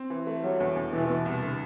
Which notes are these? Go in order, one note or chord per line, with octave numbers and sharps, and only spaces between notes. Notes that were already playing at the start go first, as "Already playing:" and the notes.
Already playing: C4
E3
A3
F#3 G3
E2
E2
B2 E3
B2
C2
D3